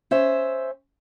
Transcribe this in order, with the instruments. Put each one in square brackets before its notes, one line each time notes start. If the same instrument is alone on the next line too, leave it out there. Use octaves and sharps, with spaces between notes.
[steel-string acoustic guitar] C#4 C5 E5